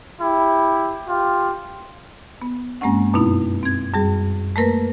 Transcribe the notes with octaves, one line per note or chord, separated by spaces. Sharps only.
E4 G4
F4 G4
B3
G2 G#3 A#3 C4 C#4 F#5
F#2 B2 B3 C4 D#4 E4
C4 G#6
F#2 G3 G#4
A3 A#3 A#4 B4